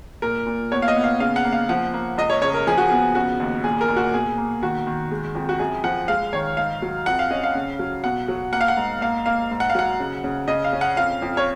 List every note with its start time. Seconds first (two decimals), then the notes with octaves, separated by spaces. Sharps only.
0.22 A#2 A#4
0.46 A#2
0.72 B3 C#5
0.82 F5
0.88 D#5
0.96 B3
1.04 F5
1.20 C#3 F5
1.36 F#5
1.44 A#3
1.53 F5
1.69 F3 F#5
1.94 A#3
2.18 C#2 D#5
2.30 C#5
2.42 C#3 C#5
2.54 A#4
2.67 F3 G#4
2.77 F#4
2.88 B3 G#4
3.15 C#3 F#4
3.40 D#2
3.64 A#2 G#4
3.81 A#4
3.88 A#2
3.96 F#4
4.14 B2 G#4
4.38 A#3
4.62 D#3 F#4
4.87 D#3
5.11 G#3
5.35 F2
5.49 F#4
5.59 F#2 G#4
5.84 F3 F#5
6.08 G#3 F5
6.33 D#3 C#5
6.57 G#2 F5
6.82 F#3
7.06 F2 F#5
7.19 F5
7.31 C#4 D#5
7.43 F5
7.55 C#3
7.79 F#3
8.04 B2 F#5
8.28 F#3
8.52 A#3 F#5
8.61 F5
8.68 F#5
8.77 G#2
9.01 A#3 F5
9.26 A#3 F5
9.51 G#2
9.60 F#5
9.70 F5
9.75 F#3 F#5
10.00 C#3
10.24 C#3
10.48 C#3 D#5
10.64 F5
10.73 C#4
10.81 F#5
10.96 F2 F5
11.22 F2
11.37 C#5